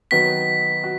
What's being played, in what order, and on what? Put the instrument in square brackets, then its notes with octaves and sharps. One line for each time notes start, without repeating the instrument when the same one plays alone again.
[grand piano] D#3 F#3 B3 D#4 F#4 [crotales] B6
[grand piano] F#4